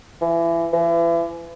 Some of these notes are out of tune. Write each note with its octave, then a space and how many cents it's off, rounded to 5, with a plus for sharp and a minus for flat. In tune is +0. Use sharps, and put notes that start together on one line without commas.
E3 +25
E3 +35